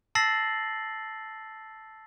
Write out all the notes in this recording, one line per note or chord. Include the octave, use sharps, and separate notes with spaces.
A5 E6 A6 A#6 C7 F#7